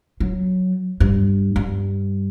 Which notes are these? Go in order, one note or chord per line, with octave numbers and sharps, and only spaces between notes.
F#3
G2
G2